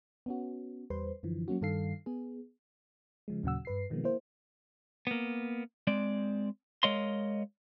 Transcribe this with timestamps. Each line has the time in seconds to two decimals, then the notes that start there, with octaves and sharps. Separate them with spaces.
0.26 B3 C#4 F#4
0.90 E2 G3 B4 C5 C6
1.23 F#2 D3 E3 F3
1.48 F#3 A#3 C#4 F#4
1.61 G2 D#3 A4 F5 C7
2.06 B3 G#4
3.28 C#3 F3 G#3
3.43 D#2 A#2 C#3 F#3 F#5 E6
3.65 G2 B4 C7
3.90 B2 D#3 F3 G#3 A#3 B3
4.04 A#3 E4 C5
5.07 A#3 B3
5.87 G#3 C4 D5
6.83 G#3 A#4 C#5 D#5 F5 C6